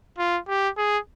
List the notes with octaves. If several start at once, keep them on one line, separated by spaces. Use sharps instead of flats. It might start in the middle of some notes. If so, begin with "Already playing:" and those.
F4
G4
G#4